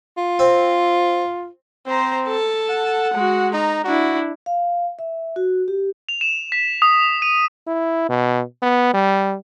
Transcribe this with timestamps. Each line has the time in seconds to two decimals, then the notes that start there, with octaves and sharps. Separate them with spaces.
0.17 F4
0.39 C4
1.86 C4 C5 A#5
2.27 A4 A5
2.69 F#5
3.14 G#3 F#4
3.54 D#4 A#5
3.84 D4 E4 F#4
4.46 F5
4.99 E5
5.36 F#4
5.68 G4
6.09 F7
6.21 E7
6.52 B6
6.82 D#6
7.22 D#7
7.67 E4
8.09 B2
8.62 B3
8.94 G3